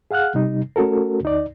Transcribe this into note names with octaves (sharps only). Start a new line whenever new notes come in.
G#4 F5 F#5 F6 F#6
C3 G3 D#4
A3 C#4 F#4 A4 A#4
D2 D#4 D5